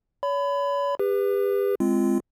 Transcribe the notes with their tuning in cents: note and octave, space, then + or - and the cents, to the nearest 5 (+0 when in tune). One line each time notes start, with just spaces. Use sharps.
C#5 +35 B5 +25
G4 +40 B4 +0
G#3 +0 C4 +0 F4 -30